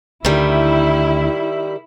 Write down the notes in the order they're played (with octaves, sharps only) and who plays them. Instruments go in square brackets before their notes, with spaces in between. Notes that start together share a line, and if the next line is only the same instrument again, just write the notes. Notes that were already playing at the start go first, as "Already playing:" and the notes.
[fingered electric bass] D2 D3 [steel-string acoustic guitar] D#3 G3 [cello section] E4